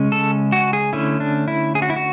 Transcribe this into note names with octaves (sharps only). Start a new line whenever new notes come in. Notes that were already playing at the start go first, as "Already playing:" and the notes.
Already playing: C#3 G#3 C#4
A4
F#4
G#4
D3 A3 C#4 E4
D4
E4
G#4
F#4
E4
F#4